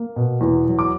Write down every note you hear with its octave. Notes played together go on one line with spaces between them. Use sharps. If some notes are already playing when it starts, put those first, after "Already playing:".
Already playing: A#3
B2
E2
F#3
D6